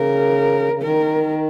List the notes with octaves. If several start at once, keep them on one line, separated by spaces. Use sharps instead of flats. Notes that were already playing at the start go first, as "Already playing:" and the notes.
Already playing: C#3 A#4
C#3
D#3 A#4